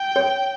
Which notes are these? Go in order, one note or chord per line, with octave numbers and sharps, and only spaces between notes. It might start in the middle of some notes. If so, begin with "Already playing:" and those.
Already playing: G5
C#5